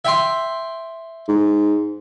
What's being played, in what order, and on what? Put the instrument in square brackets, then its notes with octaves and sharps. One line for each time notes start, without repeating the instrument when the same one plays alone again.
[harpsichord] E5 G5 C6
[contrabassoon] G#2